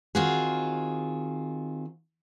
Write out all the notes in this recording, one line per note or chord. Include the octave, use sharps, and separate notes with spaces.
D#3 C4 F4 F#4 G#4